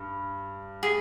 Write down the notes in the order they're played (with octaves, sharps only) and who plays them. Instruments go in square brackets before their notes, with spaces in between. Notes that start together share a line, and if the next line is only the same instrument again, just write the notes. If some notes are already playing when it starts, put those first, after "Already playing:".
Already playing: [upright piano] G2
[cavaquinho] G#4